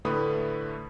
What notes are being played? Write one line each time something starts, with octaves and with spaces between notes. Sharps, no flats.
A2 D3 A3 B4 B5 D#6